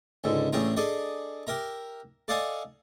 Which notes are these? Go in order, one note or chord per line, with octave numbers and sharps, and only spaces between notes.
C#2 G#2 D3
A1 A2 D4 G#4 G5 A#5
D4 G#4 A4 D5 D#5
G4 A#4 E5 A#5
A4 D5 D#5 F5 F#5 G#5